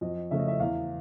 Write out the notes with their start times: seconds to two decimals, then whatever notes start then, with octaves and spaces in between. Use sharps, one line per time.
0.01 F2 D#5
0.31 C#3 F3 A3 E5
0.39 D#5
0.48 E5
0.60 E2 F5